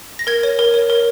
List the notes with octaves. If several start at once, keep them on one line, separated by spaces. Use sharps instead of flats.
A#6
A#4 G#6
C#5
A#4
C#5
A#4